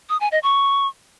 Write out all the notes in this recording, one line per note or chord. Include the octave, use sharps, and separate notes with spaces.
D#6
G#5
D#5
C#6